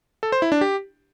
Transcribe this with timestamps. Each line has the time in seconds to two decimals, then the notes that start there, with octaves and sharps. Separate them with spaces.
0.23 A4
0.32 C5
0.42 E4
0.52 D4
0.61 G4